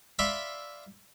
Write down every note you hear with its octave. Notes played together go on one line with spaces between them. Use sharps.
D5 E5 F5 B5 C6